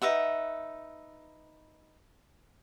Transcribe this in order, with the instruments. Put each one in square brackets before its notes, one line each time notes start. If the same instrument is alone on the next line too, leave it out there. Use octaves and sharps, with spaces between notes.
[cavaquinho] D#4 B4 E5 F#5